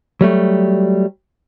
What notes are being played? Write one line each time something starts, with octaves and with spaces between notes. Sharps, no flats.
F#3 G3 A3